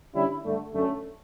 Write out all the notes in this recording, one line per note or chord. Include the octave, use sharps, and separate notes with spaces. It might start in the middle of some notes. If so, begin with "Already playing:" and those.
D3 G3 C#4 E4
G2 D3 A3
F#2 D3 A3 C#4